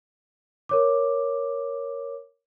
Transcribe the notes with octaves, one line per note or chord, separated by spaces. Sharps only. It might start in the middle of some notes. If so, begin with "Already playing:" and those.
A#4 C#5 D6